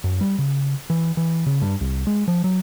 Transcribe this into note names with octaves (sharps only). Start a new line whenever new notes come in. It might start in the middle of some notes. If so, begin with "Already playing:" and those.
F#2
G3
C#3
E3
E3
C#3
G2
C2
G#3
F3
F#3